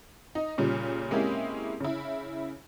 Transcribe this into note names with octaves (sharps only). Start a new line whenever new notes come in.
D#4
A#2 C#3 G3
G#3 A#3 C4 C#4 E4 G4
C#3 E4